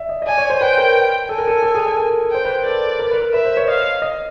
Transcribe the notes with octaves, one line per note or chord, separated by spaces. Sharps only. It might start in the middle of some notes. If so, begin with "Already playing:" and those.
Already playing: D5 E5
D#5
D#5
D5 G#5
C#5
C5
B4 G5
A#4
A4 G#5
A#4
A4
A4
G#4
A4
A#4
C5 G5
B4
A#4
A4 D5
A#4
B4
A#4
B4 E5
C5
C#5
D#5 F5
D#5